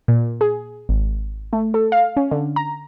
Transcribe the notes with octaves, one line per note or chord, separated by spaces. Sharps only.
A#2
G#4
G#1
A3
A4
F5
C#4
D3
A#5